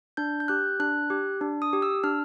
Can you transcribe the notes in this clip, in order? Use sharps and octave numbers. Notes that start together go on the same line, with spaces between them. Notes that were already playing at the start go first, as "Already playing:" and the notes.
D4 G6
G6
G4 F#6
D4 F#6
G4
D4
D#6
G4
E6
D4 F6